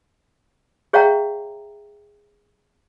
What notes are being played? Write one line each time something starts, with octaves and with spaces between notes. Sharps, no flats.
G#4 C#5 E5 F5 G5 A#5